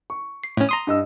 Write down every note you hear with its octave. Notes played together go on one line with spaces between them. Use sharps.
C#6
C7
A2 C#4
A#5 C6 D#6
G2 D#5 E6